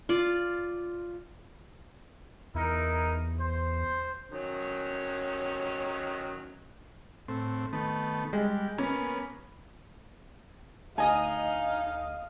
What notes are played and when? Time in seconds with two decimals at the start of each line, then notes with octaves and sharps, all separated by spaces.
0.09 F4 D5
2.55 E2 D#4 E4 A#4
3.40 C5
4.31 D#3 F#3 C#4
7.28 A2 C4
7.73 D#3 A3 B3
8.33 G3 G#3
8.78 A#3 B3 C#4
10.98 D2 D#4 D#5 F5 G#5 D#6